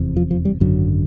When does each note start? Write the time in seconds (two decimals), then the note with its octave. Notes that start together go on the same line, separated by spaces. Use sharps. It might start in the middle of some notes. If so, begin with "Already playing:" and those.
Already playing: F1 E2 C3
0.17 F3
0.31 F3
0.45 G3
0.60 G#1 F#2 D3 F#3